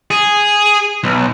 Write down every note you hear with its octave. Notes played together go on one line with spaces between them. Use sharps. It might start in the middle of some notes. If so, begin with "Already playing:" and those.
G#4
B1